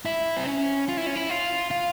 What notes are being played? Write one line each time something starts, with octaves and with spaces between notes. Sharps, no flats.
E4
C4
C#4
F4
E4
C#4
E4
F4
F4